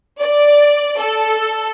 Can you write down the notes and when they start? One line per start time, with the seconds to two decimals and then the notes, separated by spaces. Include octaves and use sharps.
0.21 D5
0.98 A4